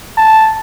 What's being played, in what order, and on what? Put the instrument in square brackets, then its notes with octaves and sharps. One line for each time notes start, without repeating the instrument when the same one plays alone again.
[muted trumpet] A5